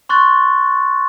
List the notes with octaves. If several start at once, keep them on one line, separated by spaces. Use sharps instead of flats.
C6 C#6 F#6 A6